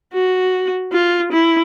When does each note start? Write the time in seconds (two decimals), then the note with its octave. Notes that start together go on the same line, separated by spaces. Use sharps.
0.13 F#4
0.92 F4
1.32 E4